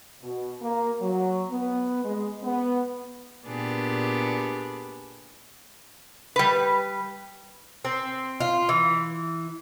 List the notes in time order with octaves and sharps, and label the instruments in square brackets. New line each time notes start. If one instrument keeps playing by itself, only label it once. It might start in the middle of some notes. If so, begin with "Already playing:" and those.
[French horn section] B2
A#3
F#3
B3
G#3
B3
[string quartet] A#2 B3 D4 G4 G#4
[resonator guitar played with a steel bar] G3 B4
[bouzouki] C4
F4
E3